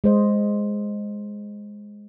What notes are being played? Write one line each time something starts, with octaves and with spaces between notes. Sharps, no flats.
G#3 C5 D#5